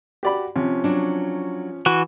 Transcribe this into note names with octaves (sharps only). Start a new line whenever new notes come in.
F#4 G4 D5 B5
C3 F3 C#4
F#3 D4
E3 F#4